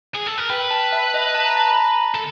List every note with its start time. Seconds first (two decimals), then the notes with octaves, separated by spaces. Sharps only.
0.15 G#4
0.27 A4
0.38 A#4
0.50 B4 G5
0.71 A5
0.92 E5
1.14 D#5
1.35 A5
1.45 A#5
1.56 A5
1.68 B5
1.76 A#5
2.15 A4